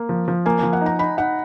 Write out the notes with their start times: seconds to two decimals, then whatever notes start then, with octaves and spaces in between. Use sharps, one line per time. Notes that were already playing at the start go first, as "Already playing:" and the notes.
Already playing: A#3
0.09 F3
0.28 F3
0.46 A#3 G#5
0.59 F3 G#5
0.73 F#5
0.81 D#4 A#5
0.99 D#4 B5
1.17 D#4 F#5